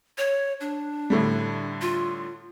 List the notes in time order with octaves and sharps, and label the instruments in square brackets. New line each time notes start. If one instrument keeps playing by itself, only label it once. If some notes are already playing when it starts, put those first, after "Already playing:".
[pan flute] C#5
D4
[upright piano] A2 D3 G3
[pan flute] F4